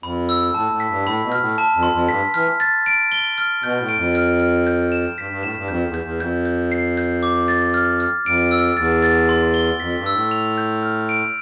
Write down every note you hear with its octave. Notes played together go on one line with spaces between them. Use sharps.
F2 B5
E6
A2 A5
A2
B6
G2
A2 B5
B2
F6
A2
A5
F2
C6
F2
G2 B6
E3 F6
A6
D7
G7
F6
B2 G6
A2
D7
F2
F6
F6
G6
E7
G2 B6
G2
A2 E7
G2
F2 G6
E2
G6
E2
F2 G6
G6
C7
G6
D6
A6
F6
F6
F2 D7
E6
E2 A6
A6
C6
G7
F2 B6
G2
E6
A2
F7
G6
F6
D7